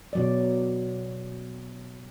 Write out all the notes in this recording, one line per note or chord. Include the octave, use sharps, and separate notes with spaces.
B2 F#3 D5